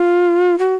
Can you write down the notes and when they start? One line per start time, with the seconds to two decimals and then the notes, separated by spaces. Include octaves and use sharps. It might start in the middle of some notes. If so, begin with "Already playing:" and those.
Already playing: F4
0.59 F#4